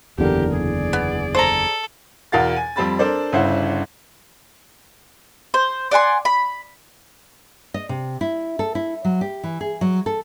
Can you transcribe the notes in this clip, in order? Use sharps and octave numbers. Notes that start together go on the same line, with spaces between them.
F#1 E2 D3 G4 A#4
G#4 D5
B3
A4 C5 A#5
E2 B2 A#4 F5 A6
G#5
F2 G3 C4 A5 B5 A6
D4 A4 A#4 C5 D5
G1 C#3 E4 C5 F#5
C5
D5 F#5 G#5 C6
B5
D#5
C3
E4
A4
E4
F#3
G4
E3
G#4
F#3
A4